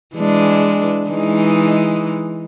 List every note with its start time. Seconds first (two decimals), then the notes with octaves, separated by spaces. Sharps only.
0.16 E3 G#3 D4
1.10 E3 G#3 D#4